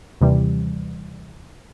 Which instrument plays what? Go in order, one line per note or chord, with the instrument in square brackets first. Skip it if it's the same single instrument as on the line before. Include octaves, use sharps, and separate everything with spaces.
[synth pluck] D#2 C3 E3 G3